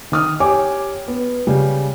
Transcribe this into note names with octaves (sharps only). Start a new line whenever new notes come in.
D#3 D#6 F6
G4 C#5 G#5 D6
B3
C#3 G3